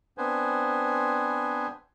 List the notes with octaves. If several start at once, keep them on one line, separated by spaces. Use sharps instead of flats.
B3 C4 D4 B4 C5 G#5